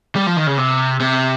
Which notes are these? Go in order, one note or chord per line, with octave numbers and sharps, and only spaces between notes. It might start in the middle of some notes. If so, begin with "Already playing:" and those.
G3
F3
D#3
C#3
C3
C3